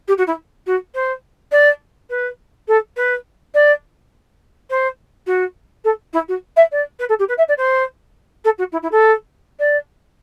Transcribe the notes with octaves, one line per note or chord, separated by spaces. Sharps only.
G4
F#4
E4
F#4
C5
D5
B4
A4
B4
D5
C5
F#4
A4
E4
F#4
E5
D5
B4
A4
G4
B4
E5
D5
C5
A4
F#4
E4
E4
A4
D5